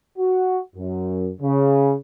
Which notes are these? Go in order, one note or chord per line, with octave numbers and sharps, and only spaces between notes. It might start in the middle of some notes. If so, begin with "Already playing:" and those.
F#4
F#2
C#3